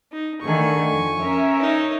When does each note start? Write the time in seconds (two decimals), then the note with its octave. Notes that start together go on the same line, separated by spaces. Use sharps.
0.12 D#4
0.41 D3 D#3 A3 G#5 C#6
0.90 F2
1.20 C#4 A#4 E5
1.60 D#4 C#5